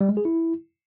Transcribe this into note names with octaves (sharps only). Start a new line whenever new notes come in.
G3
G#3
G#4
E4